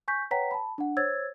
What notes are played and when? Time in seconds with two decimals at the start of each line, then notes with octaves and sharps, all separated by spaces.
0.08 G#5 C#6 G6 B6
0.31 B4 C#5 F#5 G5 A#5 B6
0.51 A5 B5
0.78 D4 F#5
0.97 C5 C#5 E6 G#6 A6